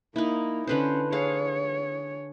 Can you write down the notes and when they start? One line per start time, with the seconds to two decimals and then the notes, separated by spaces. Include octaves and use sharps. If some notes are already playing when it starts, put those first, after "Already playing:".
0.16 A#3 D#4 E4
0.67 D3 C#4 B4 C5
1.12 G#4 C#5 F5